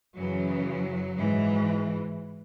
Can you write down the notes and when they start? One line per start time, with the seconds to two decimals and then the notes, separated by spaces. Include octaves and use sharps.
0.16 F#2 C#3 E3 F#3
1.16 G#2 E3